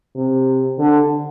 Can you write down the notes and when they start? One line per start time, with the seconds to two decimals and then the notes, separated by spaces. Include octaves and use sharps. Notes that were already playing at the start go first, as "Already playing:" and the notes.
0.15 C3
0.79 D3